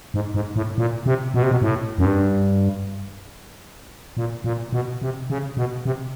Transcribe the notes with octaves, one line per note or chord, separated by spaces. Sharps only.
G#2
G#2
A2
A#2
C3
B2
C3
B2
A2
F#2
G2
A#2
A#2
B2
C3
C#3
B2
C3